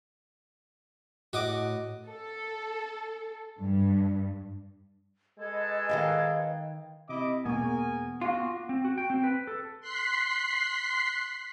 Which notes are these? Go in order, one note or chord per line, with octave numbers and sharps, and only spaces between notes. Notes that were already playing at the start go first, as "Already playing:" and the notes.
A2 F#4 D#5 D6
A4
G2
G#3 A4 B4 D#5 G#5 G#6
D#3 F5 G5
C3 E4 D#5 D6
E1 A#3 B3 G#4 A#4 G#5 C#6
F4 F#4 G#5 D6 A#6
C4
F#4
G5
C4
B4
A4
C6 F#6 B6 C7